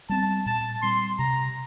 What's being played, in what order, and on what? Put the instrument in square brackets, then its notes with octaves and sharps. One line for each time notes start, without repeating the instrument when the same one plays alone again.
[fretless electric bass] G3 C4 [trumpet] A5
[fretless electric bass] A#2 [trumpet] A5
[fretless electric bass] G3 C4 [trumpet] C6
[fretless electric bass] C3 [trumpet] A#5